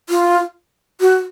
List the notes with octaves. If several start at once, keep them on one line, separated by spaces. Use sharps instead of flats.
F4
F#4